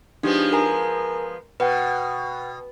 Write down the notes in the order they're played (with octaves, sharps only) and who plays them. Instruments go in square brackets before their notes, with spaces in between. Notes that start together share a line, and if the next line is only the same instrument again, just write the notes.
[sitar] F3 G#3 B3 [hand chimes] D4 D#4 G4
[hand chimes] A#4 G#5 A#5
[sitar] B2 [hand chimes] B4 F#5 G5